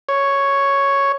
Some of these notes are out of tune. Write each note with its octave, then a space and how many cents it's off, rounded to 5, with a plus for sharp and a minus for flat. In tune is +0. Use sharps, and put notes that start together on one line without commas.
C#5 +0